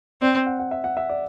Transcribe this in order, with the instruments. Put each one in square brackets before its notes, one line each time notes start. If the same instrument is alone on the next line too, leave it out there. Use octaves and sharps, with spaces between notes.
[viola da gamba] C4 [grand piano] D5
[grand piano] F#5
F#5
E5
F#5
E5
D5